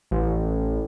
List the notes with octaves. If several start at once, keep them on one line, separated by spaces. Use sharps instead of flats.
A1